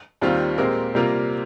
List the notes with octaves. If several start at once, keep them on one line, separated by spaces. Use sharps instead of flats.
D#2 D#3 G3 C4 F4
A#2 G#3 C4 G4 A#4
C3 G3 A#3 F4 A#4